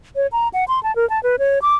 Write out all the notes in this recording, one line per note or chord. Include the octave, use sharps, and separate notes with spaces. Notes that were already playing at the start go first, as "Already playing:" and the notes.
C#5
A#5
F#5
C6
A5
A#4
A5
B4
C#5
D6